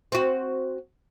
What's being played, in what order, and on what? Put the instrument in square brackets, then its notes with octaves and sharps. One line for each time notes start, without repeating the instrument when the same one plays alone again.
[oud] C4 F#4